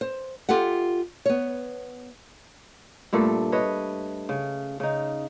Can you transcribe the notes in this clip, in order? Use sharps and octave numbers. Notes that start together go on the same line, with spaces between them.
C5
F4 G4 A4 E5 F#5
B3 C#5
G2 A#2 A3 A4
B4 C#5 D#5
C#3
C#3 D#4